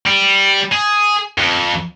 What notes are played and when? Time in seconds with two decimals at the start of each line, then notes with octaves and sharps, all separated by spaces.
0.07 G3
0.72 G#4
1.38 F2